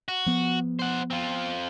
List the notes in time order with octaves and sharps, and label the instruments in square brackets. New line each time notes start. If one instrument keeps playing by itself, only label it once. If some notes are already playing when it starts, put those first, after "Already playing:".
[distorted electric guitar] F#4
[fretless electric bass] F3 B3
[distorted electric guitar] C5 F#5
C4 F4